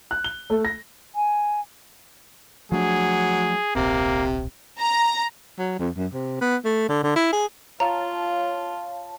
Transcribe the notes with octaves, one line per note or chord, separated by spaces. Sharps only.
F#6
G7
A3
A#6
G#5
F3 F#3 A3 D4 G#4
D1 A#1 C3 A#3
A#5
F#3
F2
F#2
C3
B3
A3
D3
D3
E4
G#4
F4 C#5 F5 A5 A#5